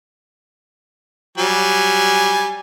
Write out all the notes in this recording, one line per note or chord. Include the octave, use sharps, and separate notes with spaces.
F#3 G3 G#5